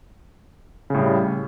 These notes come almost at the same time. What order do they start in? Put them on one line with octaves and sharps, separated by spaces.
C#3 A2 G3